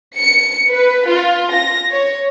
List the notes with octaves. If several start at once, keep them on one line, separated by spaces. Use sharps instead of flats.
C#7
B4
F4
A#6
C#5